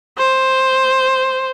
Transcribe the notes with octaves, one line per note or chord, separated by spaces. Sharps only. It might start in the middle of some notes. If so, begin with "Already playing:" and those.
C5